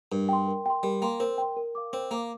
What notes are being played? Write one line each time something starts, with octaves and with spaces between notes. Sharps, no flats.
G2 A#4
G5 C6
A#4
G5 C6
G3 A#4
A#3 G5 C6
C4 A#4
G5 C6
A#4
F5 D6
C4 A#4
A#3 F5 D6